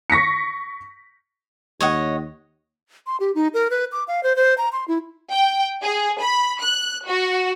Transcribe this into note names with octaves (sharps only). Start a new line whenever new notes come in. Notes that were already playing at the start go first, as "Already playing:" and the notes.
C#6 A#6 B6 C#7
D#2 C#5 D#5 F#5
C6
G4
D#4
A#4
B4
D6
F5
C5
C5
A#5
C6
E4
G5
G#4
B5
F#6
F#4